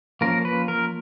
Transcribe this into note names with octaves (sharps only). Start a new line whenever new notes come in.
F3 A#3 C#4 A#4
B4
A#4